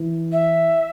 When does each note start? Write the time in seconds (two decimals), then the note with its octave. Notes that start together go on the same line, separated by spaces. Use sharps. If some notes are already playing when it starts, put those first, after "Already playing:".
Already playing: E3
0.32 E5